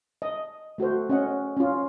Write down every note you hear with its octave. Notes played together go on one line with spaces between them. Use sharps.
D#5
A3 F#4 A4 C5
C#4 D#5 F#5
C#4 F4